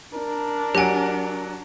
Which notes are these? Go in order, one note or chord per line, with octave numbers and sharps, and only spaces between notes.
D4 A#4
F#3 G4 F#5 G#5 D7